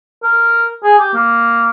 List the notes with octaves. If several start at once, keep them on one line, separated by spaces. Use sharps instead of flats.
A#4
G#4
G4
A#3